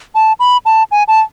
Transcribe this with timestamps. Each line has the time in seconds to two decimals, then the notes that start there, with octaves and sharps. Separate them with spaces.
0.15 A5
0.40 B5
0.66 A5
0.91 G#5
1.08 A5